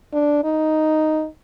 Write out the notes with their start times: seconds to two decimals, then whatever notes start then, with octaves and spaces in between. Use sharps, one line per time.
0.13 D4
0.44 D#4